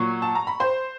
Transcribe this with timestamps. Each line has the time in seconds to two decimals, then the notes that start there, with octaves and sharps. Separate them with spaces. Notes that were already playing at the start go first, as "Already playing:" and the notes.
Already playing: A#2 F#3 C#6
0.22 A5
0.35 A#5
0.47 B5
0.60 C5 C6